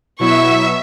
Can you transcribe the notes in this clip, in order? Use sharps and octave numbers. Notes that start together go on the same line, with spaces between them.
B2 F#3 B3 E4 E5 C#6 E6